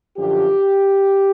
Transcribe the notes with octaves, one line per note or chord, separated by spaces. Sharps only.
F#2 D3 F3 G4